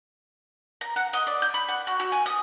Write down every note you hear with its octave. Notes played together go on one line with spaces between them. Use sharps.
A#5
F#5
D#5
D5
G6
B5
F#5
F#4
F#4
G#5
D#6